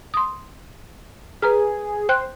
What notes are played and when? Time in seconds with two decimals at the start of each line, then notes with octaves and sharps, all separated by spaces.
0.14 C6 D#6
1.42 G#4 B4 A#5 F6
2.09 C5 G5 F#6